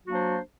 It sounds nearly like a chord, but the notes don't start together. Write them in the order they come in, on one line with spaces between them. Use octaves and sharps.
F#3 F#4 A#3 D4 C5